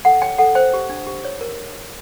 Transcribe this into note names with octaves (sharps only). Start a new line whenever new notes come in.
A4 F#5
C#5 G5
A4 F#5
C5 G5
G4
D4
G4
C#5
A#4